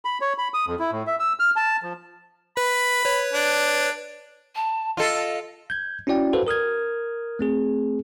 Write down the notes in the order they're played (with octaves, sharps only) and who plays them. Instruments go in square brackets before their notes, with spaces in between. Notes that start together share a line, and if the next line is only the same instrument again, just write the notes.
[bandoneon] B5
C#5
B5
D#6
F2
E4
A2
E5
E6
F6
A5
F3
[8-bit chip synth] B4 [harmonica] B5
[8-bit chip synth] B4 C#5
[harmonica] D4
[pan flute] A5
[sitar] F4 A4 [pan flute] D#5
[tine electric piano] G6 G#6
C#4 E4 F#4 D5 G5
F#4 A4 B4 C5 F5
A#4 D#6 F6 G#6
A3 C4 G#4